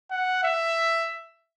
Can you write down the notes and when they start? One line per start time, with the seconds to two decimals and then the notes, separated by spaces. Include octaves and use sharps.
0.11 F#5
0.44 E5